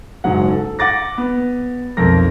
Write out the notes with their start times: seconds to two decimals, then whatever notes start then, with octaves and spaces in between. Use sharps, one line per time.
0.24 F#1 G#2 F#3 F#5
0.50 A4
0.79 F#5 D6 A6 A#6
1.18 B3
1.97 B1 F2 A#4 A#6